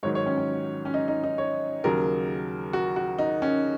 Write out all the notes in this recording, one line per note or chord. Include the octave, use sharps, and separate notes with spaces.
G#2 D#3 F#3 C#5
C#5
C#4
C#4
C#4
D#4
D#4
D#4
C#5
D#2 C#3 F#3 A#4
F#4
F#4
D#4
C#4